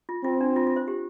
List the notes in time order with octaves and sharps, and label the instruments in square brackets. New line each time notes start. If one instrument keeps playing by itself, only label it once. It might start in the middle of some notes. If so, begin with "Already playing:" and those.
[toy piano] F4
[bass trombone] C4 [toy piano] F4
[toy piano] D4
F4
F4
C5
G4